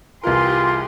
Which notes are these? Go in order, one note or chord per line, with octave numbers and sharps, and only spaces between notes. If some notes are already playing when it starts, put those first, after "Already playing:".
C2 E3 F4 G4 G#4 A#4 C6